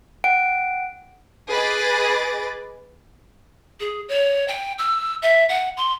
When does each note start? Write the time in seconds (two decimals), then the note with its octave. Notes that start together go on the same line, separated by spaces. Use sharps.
0.24 F#5 G5 D7
1.49 G#4 B4 D#5 D6 A6
3.80 G#4
4.08 C#5
4.48 G5
4.78 E6
5.22 E5
5.49 F#5
5.77 C6